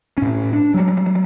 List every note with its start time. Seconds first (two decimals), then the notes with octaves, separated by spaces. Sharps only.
0.18 A2 C#4
0.53 D4
0.74 F#3 G3